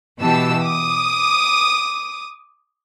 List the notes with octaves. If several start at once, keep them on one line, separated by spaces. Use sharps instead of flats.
B2 E3 G4 A5 E6
D6 D#6